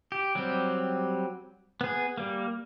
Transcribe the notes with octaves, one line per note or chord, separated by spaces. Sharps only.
G4
F#3 G3 C4 G4
B3 G#4
G3 A#3